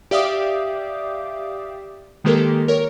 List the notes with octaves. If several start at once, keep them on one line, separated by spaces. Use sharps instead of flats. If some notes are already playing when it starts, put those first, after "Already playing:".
G4 D5 E5 F5 D6 D#6
D#3 G#3 A#3 G4 A4 A#4
A#4 C#5